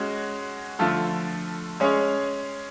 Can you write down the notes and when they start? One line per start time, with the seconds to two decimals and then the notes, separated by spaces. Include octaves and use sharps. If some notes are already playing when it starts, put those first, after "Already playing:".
Already playing: G#3 C#4 F#4 C#5
0.79 D3 F3 A3 F4 A4
1.80 G#3 C#4 G#4 C#5